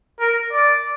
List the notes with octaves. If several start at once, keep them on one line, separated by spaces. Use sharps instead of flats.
A#4
D5